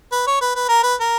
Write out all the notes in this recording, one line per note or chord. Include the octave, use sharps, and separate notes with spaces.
B4
C#5
B4
B4
A#4
B4
A#4